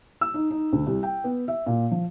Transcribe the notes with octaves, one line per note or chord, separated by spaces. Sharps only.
E6
D#4
D#4
D2
C2
G5
B3
E5
A#2
F3